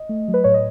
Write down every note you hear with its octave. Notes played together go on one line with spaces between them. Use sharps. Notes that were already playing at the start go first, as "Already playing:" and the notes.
Already playing: D#5
A3
F#3
B4
A2 C#5
D#5